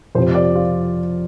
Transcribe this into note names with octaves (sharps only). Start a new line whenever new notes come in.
F2 C3 F3 C5
D5
F4